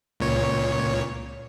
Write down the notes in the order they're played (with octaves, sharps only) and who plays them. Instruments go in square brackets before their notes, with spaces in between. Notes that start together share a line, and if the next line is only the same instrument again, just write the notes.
[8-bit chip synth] C#2 A#2 C#5